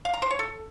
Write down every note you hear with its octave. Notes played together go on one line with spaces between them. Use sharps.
F5
A#5
C5
C#5
A4